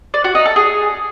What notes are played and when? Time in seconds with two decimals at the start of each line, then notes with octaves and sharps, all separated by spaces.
0.14 D5
0.24 F#4
0.35 D#4
0.46 A4
0.56 G#4